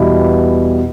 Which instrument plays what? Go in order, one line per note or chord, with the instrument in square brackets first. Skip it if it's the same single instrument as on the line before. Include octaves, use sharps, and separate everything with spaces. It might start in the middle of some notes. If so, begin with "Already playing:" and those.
Already playing: [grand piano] E2 B2 G3 E4